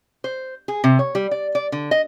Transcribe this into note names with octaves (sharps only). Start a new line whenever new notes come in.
C5
G#4
C3
C#5
G3
D5
D5
D3
D#5